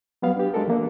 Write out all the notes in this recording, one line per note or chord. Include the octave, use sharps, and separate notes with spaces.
F#3 G3 B3 F5
D4 G4
G#3 D4 F#4 G4 A4 A#4
E3 A#3 D4